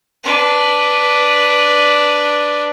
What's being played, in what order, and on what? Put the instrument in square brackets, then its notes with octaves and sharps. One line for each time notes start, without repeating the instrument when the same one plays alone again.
[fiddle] D4 B4